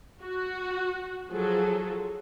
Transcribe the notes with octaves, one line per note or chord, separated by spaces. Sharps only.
F#4
F3 F#3 G#4 A4